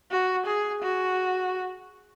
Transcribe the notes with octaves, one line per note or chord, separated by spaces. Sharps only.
F#4
G#4
F#4